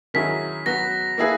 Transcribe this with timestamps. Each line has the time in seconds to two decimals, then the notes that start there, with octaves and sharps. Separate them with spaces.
0.14 D#3 F#3 C#4 E4 G#4 B6
0.66 F#3 B3 F#4 A#6
1.17 A#3 E4 G#4 B4